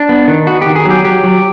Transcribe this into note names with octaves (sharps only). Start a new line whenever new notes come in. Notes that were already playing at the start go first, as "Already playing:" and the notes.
Already playing: D4
B3
D#3
B3 F#4
D#3 G4
G#4
F#3 G4
F#3 G4
F#3